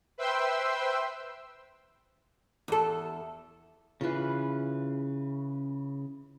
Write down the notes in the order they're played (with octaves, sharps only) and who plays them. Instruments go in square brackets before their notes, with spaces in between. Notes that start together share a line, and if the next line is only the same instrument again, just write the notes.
[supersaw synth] B4 C5 E5 G5 C6 E6
[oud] E2 A4
[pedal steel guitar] C#3 B4 [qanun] E3 F4